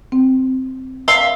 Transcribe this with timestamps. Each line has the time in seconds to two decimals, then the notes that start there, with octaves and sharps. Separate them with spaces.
0.12 C4
1.08 E5 F5 C6 E6